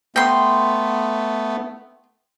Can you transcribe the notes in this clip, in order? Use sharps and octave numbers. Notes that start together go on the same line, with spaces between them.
A3 B3 G5 C6